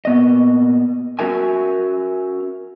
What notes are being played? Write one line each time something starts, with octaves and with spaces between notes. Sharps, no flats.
A#2 B3 D#5
C#4 D4 F#4 A#4 E5 G#5